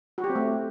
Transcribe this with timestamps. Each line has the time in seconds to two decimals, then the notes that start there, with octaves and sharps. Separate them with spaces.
0.18 F#4
0.24 G4
0.30 C4
0.35 A3